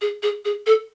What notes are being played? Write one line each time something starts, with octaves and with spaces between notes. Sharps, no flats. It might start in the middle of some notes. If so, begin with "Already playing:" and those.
G#4
G#4
G#4
A4